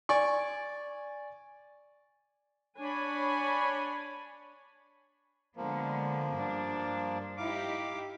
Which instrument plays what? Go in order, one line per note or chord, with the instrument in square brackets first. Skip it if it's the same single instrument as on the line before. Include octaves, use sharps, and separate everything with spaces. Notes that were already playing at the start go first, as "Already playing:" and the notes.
[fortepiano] D5 G#5 C#6
[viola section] D4 C#5 G#5 B5
[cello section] D3 G#3 B3 [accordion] F3 A#3
[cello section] G2 D4
[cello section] D#4 E4 G4 [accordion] F5 D6